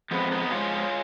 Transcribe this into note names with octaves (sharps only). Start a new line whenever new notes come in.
F2 F3 G#3 B3
B3 D#4
G#2 F3 G#3 C#4 F4